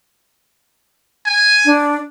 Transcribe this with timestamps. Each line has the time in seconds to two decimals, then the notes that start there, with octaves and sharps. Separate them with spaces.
1.26 G#5
1.65 D4